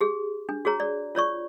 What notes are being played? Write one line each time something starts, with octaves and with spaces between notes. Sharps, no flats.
G4 G#4
D4
F#4 G#4 C#5 A#5
D5
F4 C#5 D5 C#6